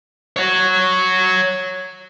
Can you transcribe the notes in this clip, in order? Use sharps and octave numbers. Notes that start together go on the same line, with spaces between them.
C#5 F#5